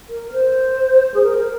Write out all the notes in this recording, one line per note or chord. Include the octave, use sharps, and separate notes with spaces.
A#4
C5
G#4
A#4